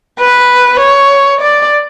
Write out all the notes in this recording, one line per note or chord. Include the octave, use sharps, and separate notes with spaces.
B4
C#5
D5